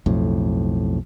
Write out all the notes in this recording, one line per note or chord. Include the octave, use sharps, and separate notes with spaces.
B1 F2 A2